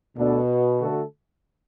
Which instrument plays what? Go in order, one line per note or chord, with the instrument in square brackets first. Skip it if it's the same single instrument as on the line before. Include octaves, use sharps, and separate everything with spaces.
[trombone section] D2 D3 A3 D4 A4 [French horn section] B2
[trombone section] D3 A3 F#4 A4